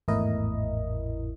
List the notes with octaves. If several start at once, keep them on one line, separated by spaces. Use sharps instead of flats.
G#1 E2 A2 E4 A#4 D#5